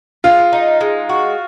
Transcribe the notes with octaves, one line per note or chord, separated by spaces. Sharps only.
G#3 F4
D#4
G#3
F#4